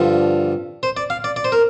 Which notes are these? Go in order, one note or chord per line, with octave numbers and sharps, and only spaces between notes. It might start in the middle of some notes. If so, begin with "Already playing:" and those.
Already playing: G2 D3 F3
C5
D5
F5
D5
D5
C5
A#4